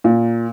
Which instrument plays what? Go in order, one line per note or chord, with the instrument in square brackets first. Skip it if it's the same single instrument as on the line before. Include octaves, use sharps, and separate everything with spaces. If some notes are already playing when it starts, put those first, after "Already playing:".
[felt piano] A#2